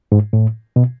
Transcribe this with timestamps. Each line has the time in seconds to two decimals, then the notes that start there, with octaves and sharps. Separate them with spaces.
0.12 G#2
0.33 A2
0.76 B2